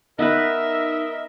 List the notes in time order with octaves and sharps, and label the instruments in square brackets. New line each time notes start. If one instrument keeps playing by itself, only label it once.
[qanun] B3 B4 [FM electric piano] D#4 [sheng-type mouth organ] A#4 D#5 [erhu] E5